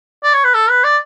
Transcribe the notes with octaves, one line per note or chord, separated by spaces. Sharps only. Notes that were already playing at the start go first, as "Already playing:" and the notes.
D5
C#5
B4
A4
B4
D5